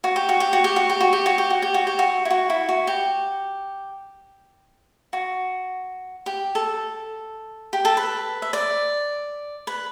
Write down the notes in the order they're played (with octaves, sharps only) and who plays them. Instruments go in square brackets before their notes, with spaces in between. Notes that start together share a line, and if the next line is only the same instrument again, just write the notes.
[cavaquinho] F#4
G4
F#4
G4
F#4
G4
F#4
G4
F#4
G4
F#4
G4
F#4
G4
F#4
G4
F#4
E4
F#4
E4
F#4
G4
F#4
G4
A4
G4
A4
B4
E5
D5
B4